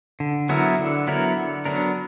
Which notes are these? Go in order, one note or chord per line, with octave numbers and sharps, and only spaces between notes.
D3
F#3 B3 E4 A#4
D3
F#3 B3 E4 A#4
D3
F#3 B3 D4 A#4